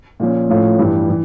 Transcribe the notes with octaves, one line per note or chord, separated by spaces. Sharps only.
A#2 F3 C#4
A2 F3 A3 C#4 F4
G2 E3 G3
E3